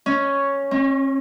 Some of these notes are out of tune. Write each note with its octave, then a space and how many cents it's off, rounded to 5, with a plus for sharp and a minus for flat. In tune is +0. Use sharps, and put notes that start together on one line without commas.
C#4 +0
C#4 -40